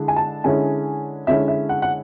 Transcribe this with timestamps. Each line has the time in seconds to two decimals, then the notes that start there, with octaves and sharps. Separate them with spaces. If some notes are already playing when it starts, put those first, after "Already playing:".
Already playing: D3 G#3 E4
0.08 G#5
0.16 A5
0.44 D3 G#3 C#4 E4 G#5
1.27 D3 G#3 C#4 E4 E5
1.48 E5
1.69 F#5
1.82 F#5